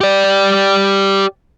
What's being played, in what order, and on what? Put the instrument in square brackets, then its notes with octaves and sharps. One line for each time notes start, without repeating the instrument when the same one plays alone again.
[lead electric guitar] G4 D5